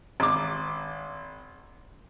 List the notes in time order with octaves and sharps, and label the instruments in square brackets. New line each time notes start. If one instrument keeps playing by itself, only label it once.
[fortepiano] G#1 D6